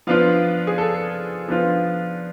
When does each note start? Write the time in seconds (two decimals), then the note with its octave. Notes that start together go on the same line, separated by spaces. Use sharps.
0.07 F3 B3 D4 F4 F5
0.67 G#4
0.78 A4
1.48 F3 B3 D4 F4